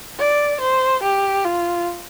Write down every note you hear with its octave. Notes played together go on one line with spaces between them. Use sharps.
D5
C5
G4
F4